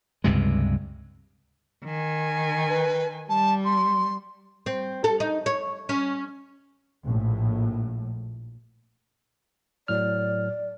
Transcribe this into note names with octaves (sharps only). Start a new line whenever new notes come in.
C#2 G2 C3 G#3
D#3 G#5
B4
G3 A5
C6
C4
A4
D#4
C#5
C#4
A#1 A2
A2 F#3 D5 F6